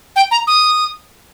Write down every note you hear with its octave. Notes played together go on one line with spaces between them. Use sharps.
G5
A#5
D#6